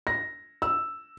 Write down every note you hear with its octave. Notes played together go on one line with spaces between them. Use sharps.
A#6
E6